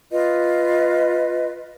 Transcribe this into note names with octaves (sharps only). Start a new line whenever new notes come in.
F4 B4 D#5